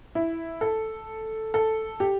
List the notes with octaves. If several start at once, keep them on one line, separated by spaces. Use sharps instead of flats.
E4
A4
A4
G4